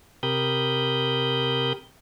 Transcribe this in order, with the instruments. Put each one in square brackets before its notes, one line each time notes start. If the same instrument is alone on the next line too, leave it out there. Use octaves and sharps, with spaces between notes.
[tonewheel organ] C3 G4 A#4 B5 D#6 G6